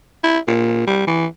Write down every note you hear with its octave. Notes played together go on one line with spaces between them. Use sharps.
E4
A#2
G3
E3